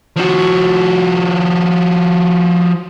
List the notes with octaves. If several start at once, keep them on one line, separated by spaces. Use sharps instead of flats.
F3 F#4